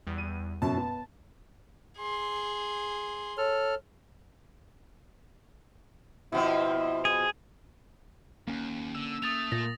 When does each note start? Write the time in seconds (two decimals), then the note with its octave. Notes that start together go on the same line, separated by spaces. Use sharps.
0.07 E2 G3
0.18 D#7
0.62 F#2 B2 C#4 A5
0.77 B3
1.98 G#4 C6
3.38 A4 C#5 F6
6.32 B2 F3 C4 E4
7.05 G#4
8.48 D#2 A#3 C#4
8.95 D3 E6
9.22 A3 D#6 A6 F7
9.52 A#2 A6 A#6